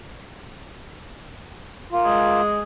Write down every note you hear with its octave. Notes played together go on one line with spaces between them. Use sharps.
A#3 F4
G#3 G#4